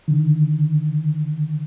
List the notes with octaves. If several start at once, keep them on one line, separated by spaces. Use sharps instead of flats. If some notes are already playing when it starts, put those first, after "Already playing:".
D3 D#3